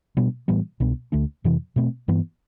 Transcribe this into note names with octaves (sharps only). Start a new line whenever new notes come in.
B2 G3 B3 D4
A2 E3 G3 B3
C2 B2 B3 D4
D2 D3 A3 D4
F2 C3 E3
B2 A3 C4
G2 E3 B3